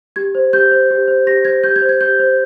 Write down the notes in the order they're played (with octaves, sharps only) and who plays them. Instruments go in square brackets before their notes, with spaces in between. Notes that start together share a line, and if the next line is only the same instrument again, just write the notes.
[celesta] G4 G#6
C5
G4 G6
C5
G4
C5
G4 A#6
C5 G#6
G4 G6
G#6
C5
G#6
G4 G6
C5